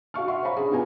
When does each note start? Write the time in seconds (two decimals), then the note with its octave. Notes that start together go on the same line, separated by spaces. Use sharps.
0.14 F#4 F5 C#6 F6
0.28 E5 F#5 C6 C#6
0.43 C5 C#5 F5 A#5 B5 C#6
0.57 C#4 D4 G#4
0.71 B3 F4 G4 G#5 A#5